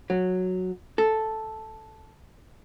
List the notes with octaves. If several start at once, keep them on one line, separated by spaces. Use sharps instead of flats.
F#3
A4